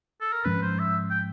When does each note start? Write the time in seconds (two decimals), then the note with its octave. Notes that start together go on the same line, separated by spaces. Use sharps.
0.21 A4
0.33 A#4
0.44 G#2 F3 G#3 C#4 B4
0.62 C5
0.79 E5
1.11 G5